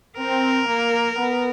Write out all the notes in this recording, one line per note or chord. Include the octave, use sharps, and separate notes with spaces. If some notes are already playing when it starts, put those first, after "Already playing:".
C4 A#4
A#3
B3